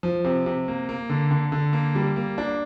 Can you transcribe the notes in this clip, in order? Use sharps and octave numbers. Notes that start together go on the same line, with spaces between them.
F3
C3
C3
A#3
A#3
D3
D3
D3
A#3
G3
A#3
D4